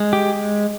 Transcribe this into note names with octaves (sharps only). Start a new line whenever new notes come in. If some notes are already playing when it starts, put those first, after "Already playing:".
Already playing: G#3
G4